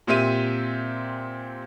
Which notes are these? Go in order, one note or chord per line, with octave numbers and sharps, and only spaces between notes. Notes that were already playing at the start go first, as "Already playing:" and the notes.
A#2 C4 G4 E5 D#7